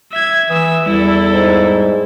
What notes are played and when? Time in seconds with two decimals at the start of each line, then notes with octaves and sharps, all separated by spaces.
0.13 E5 G#6
0.50 E3 E5 D#6 E6
0.86 E2 G3 E4 A4
1.33 G#2